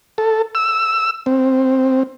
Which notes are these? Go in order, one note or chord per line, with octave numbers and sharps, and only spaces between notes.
A4
E6
C4